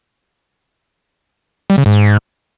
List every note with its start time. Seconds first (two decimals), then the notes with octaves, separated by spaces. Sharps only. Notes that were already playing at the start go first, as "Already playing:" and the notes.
1.70 G3
1.78 C#3
1.86 G#2